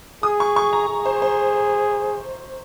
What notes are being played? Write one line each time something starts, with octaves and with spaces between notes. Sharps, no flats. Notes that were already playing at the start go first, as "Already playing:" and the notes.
G#4 D#6
C#6
C#6
A#5
G#4
C5
C5